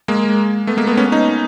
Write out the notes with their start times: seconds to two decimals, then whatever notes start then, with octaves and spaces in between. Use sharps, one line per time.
0.08 G#3 A#3
0.67 A3 B3
0.77 G#3 A#3
0.87 A3 B3
0.97 B3 C#4
1.12 C#4 D#4